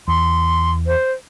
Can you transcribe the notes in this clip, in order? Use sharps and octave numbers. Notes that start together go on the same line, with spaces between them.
E2 C6
C5